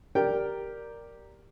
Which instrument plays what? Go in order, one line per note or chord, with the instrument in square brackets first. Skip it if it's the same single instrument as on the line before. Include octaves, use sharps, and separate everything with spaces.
[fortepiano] G4 A#4 D5 G5